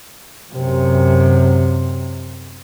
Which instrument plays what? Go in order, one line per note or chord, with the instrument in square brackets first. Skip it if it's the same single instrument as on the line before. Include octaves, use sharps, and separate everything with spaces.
[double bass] F#2 C3